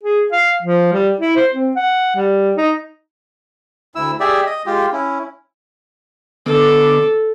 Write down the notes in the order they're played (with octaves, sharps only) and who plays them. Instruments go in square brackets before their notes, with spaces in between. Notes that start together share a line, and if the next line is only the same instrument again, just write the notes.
[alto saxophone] G#4
F5
F3
G3
E4
C5
C4
F#5
G3
D#4
[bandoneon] D2 E4 E6
G4 G#4 D5 E5
D#5
G#3 F4 G4
C#4 E4
[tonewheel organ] D3 B3 D6 [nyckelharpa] A4